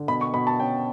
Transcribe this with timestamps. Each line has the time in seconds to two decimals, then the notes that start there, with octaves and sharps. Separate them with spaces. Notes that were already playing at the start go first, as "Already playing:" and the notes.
Already playing: D3
0.08 B2 B5
0.21 C#6
0.34 B2 B5
0.47 A5
0.60 C#4 G5